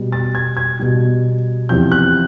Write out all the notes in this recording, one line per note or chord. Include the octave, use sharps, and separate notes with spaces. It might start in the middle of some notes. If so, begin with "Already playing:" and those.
Already playing: B2 G3
A6
G#6
G#6
B2 G3
E2 C3 F3 G6
F#6